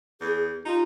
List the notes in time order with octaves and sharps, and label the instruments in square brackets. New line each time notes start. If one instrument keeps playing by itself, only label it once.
[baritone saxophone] E2 [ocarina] G#4
[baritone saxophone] D#4 [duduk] F4 [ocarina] G4